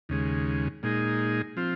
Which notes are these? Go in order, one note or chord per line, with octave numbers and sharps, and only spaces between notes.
D#2 C#3 G#3
A#2 G#3 D#4 G#4
F3 C4 F4